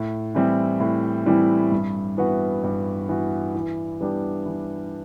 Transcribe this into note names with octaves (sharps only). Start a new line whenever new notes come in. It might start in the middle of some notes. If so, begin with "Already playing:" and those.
Already playing: A2
E3 G3 C4 E4
A2
E3 G3 C4 E4
G2
E3 B3 F#4
G2
E3 B3 F#4
E3
G3 B3 D4 G4
E3